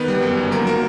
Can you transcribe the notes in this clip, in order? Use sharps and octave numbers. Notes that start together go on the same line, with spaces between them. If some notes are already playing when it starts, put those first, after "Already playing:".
Already playing: D#3 B3 B4
G3
F#2
G1
F#3 A#3 A#4
A#3 A#4